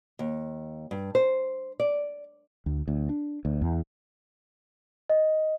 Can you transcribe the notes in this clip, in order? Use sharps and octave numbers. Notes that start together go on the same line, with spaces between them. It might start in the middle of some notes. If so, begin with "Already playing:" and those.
D#2
G2
C5
D5
D2
D2
D4
D2
E2
D#5